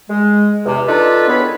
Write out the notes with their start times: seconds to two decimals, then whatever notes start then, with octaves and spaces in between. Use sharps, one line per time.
0.09 G#3
0.65 E2 C3
0.87 D4 D#4 F4 A4 B4
1.28 E2 D#3 B3 C#5 B5